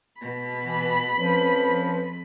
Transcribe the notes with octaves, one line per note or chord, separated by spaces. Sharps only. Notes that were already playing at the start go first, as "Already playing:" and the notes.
B2 B5
E3
F2 F3 C#4 B4